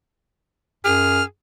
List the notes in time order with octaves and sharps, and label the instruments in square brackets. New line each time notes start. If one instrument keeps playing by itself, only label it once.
[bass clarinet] F#2 [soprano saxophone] G#4 [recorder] F6